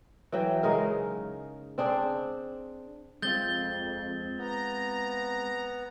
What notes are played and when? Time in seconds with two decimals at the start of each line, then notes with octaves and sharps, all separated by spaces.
0.32 E3 F#3 G5
0.63 C#3 G#3 D#4 A#4
1.78 C4 D4 G#4 C5
3.22 F2 G#3 C4 F4 G6 A6 G7
4.38 B3 A#5